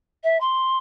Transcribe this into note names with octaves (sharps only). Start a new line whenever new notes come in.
E5
C6